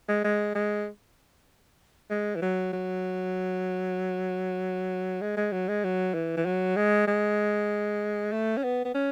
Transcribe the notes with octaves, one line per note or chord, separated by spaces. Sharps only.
G#3
G#3
G#3
G#3
E3
F#3
F#3
G#3
G#3
F#3
G#3
F#3
E3
E3
F#3
G#3
G#3
A3
C#4
B3
B3
C#4